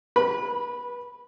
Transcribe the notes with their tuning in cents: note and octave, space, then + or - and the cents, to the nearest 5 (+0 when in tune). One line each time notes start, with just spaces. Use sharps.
B4 -30 B5 -5